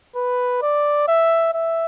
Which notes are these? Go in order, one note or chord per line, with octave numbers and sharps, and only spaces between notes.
B4
D5
E5
E5